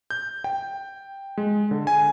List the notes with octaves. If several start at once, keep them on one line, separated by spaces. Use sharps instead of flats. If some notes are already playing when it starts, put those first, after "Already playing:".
G6
G5
G#3
D3
G#5